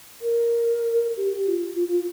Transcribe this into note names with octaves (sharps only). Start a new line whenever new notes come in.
A#4
G4
G4
F4
F4
F4